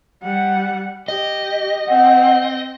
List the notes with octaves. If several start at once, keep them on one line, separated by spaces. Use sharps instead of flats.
G3 F#5
G4 D#5
C4 F#5